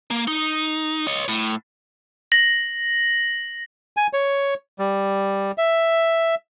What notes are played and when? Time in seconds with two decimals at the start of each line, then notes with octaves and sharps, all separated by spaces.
0.11 A#3
0.28 D#4
1.07 C#5 D#5
1.28 A2
2.32 A#6 F#7
3.97 G#5
4.13 C#5
4.79 G3
5.58 E5